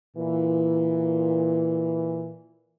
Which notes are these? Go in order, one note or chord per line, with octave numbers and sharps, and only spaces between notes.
A#2 E3